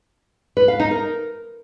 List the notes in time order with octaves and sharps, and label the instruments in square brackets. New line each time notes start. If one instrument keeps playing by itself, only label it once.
[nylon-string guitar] B4
F5
D#4
A#4